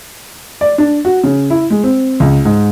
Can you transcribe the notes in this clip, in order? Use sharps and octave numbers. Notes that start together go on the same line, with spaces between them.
D5
D4
F#4
C#3
E4
G#3
C4
C#2
G#2